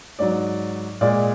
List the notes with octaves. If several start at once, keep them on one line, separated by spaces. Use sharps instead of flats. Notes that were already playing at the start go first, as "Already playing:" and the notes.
G#2 F#3 D5
A#2 G#3 D5